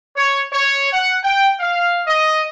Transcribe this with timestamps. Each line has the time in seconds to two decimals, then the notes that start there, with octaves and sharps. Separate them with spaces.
0.16 C#5
0.52 C#5
0.93 F#5
1.24 G5
1.60 F5
2.07 D#5